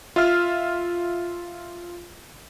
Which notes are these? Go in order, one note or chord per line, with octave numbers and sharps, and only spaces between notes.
F4 E5 F6